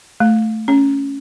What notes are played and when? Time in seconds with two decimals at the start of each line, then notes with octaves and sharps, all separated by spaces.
0.20 A3
0.68 C#4